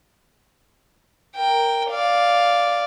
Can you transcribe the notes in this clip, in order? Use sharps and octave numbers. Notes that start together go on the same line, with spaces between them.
A#4 G5
D5 F5